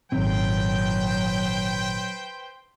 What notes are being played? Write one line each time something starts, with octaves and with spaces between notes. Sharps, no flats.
G#1 A#2 D#3 F#3 C4 B4 C5 G5